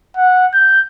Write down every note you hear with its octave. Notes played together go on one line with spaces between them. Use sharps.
F#5
G6